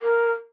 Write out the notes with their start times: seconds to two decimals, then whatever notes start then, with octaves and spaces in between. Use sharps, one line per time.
0.01 A#4